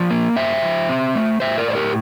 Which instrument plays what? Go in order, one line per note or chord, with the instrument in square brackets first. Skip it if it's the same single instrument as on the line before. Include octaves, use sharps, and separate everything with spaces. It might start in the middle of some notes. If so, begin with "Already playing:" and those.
Already playing: [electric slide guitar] F3 D5 F5
A#3
G2 C5 E5
F3
C4
A3
A2 C5 E5
A#4 D5
A2 C5
G4 A#4